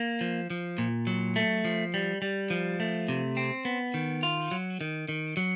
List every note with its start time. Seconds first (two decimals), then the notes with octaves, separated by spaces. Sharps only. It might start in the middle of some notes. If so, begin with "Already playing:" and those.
Already playing: A#3
0.21 F3
0.50 F3
0.78 A#2
1.07 F#3
1.36 A3
1.65 F3
1.94 G3
2.22 G3
2.50 F3
2.80 A3
3.09 C3
3.37 C4
3.65 B3
3.94 D#3
4.23 F4
4.51 F#3
4.81 D#3
5.09 D#3
5.37 F#3